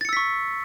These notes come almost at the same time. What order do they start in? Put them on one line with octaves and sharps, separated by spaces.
A6 C#7 E6 B6 C#6